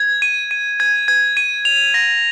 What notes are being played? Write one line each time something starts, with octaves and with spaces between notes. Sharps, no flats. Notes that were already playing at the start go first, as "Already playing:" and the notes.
Already playing: G#6
D#7
D#7
G#6
G#6
D#7
F7
A#6